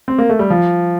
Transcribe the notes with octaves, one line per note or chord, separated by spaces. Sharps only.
C4
A#3
A3
G3
F3